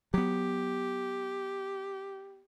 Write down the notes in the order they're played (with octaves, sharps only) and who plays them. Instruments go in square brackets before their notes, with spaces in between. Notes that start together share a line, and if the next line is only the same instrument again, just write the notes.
[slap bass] F#3 B3 [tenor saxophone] G4